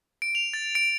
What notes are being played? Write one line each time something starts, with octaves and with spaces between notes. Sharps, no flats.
D7
F7
A6
D7